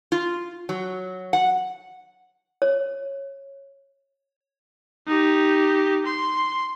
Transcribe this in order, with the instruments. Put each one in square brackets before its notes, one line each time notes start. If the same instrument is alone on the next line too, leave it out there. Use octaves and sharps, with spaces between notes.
[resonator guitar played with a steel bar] F4
F#3
F#5
[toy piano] C#5
[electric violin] D#4 G4
C6